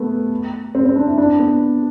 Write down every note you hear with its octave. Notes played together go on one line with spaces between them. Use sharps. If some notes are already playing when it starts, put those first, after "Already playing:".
Already playing: A3 B3
C4
C4
D4
E4
D4
B3